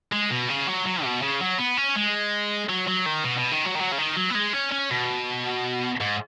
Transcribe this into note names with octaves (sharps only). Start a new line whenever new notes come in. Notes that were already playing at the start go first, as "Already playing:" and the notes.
G#3
B2
C#3
F#3
F#3
B2
C#3
F#3
B3
C#4
G#3
F#3
F#3
D#3
B2
B2
D#3
F#3
D#3
F#3
C#3
D#3
F#3
B3
G#3
C#4
C#4
B2
G#2